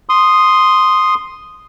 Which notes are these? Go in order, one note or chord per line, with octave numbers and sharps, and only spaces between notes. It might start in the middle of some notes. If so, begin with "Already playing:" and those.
C6 D#6